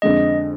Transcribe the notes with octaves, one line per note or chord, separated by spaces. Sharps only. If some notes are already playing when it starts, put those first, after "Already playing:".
F2 D3 G#3 D#5